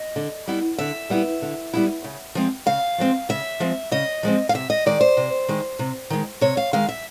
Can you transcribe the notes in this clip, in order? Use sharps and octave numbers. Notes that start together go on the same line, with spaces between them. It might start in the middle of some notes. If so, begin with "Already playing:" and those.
Already playing: D#5
D3
G3 B3 E4
D3 E5
G3 B3 E4
D3
G3 B3 E4
C#3
F3 G#3 C4
C#3 F5
F3 G#3 C4
C#3 E5
F3 G#3 C4
C#3 D#5
F3 G#3 C4
F5
C3 E5
D#5
D#3 G#3 D5
C5
C3
D#3 G#3
C3
D#3 G#3
C3 C#5
F5
D#3 G#3 F5
E5